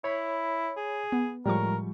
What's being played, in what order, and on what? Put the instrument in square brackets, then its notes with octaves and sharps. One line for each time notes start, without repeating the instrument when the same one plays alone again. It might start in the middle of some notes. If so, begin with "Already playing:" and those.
[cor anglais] E4 [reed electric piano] C#5 B5
[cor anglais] G#4
[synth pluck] B3
[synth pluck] A2 G#3 C#6 [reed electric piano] F3 G3 [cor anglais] A#4